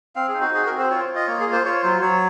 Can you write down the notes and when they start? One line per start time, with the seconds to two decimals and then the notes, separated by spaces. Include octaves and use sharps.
0.16 C4 F5
0.28 G#4
0.34 D#4
0.41 F#4
0.54 F#4 G#4
0.66 C4 A#4
0.79 C5
0.90 F4 C#5
1.09 F4
1.16 D#5
1.27 A#3 C#5
1.40 G#4
1.46 F4
1.52 C5
1.65 F4 C#5
1.83 F#3 C5
2.01 F#3 C#5